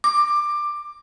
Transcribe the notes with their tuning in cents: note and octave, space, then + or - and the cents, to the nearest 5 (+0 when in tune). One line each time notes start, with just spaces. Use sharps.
D6 +15